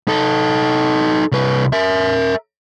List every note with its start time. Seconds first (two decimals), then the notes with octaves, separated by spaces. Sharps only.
0.08 D#4 A4
1.32 C2 B4
1.73 A#4 E5